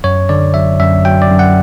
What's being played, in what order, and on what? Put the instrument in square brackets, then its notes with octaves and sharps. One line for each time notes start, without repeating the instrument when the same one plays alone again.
[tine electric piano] F#2 C#5
D3 D5
F#3 E5
F#2 E5
F#3 G5
D5
F#2
F#5